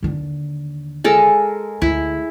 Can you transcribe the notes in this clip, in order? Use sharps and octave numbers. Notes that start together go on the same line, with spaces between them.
D#2 D3
G#3 A4 A#4
D2 E4